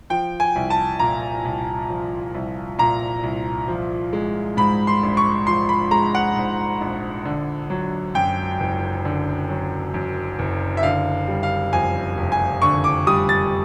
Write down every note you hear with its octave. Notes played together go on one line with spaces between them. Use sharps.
F3 G5
G#5
C2
A5
A#2 A#5
C2
F3
C2
A#2 A#5
C2
F3
G#3
G#2 B5
C6
A#1
C#6
F3 C6
B5
G#3 A#5
F#5
G#2
A#1
D3
F#3
F#2 G5
F#1
D3
F#3
F#2
F#1
E5
D3 F5
G3
F5
F2 G#5
F1
G#5
D3 C#6
D6
G3 D#6
A6